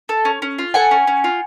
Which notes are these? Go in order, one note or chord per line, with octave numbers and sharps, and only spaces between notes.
A4
C#4
C#4
F4
A4 F#5 G#5
C#4
C#4
F4